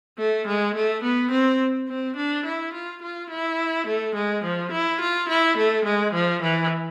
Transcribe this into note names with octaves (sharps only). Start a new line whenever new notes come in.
A3
G#3
A3
B3
C4
C4
D4
E4
F4
F4
E4
A3
G#3
F3
E4
F4
E4
A3
G#3
F3
E3